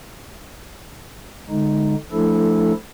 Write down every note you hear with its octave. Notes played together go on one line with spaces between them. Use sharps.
D3 G#3 D#4
F3 A3 D4 E4 A4